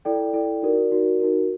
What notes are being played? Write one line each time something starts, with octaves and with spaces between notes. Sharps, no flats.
E4 A4 D5 G5
E4 A4 D5 G5
D#4 F#4 A#4 D5
D#4 F#4 A#4 D5
D#4 F#4 A#4